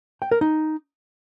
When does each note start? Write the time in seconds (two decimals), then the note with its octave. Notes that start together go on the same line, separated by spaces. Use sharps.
0.22 G5
0.31 A#4
0.41 D#4